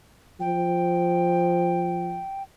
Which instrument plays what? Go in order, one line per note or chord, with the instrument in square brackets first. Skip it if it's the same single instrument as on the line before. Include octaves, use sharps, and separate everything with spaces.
[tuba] F3 [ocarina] G5